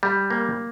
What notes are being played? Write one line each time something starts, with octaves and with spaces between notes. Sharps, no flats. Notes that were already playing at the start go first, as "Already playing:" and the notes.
G3
A#3